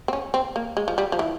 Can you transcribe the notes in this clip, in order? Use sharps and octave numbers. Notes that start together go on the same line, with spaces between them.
C4
C#4
C4
A#3
G#3
F3
G3
F3
E3